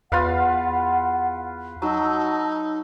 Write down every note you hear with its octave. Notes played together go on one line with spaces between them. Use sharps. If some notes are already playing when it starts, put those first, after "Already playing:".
E2 F4 B4 F5 F#5
F#3 D#4 A5 E6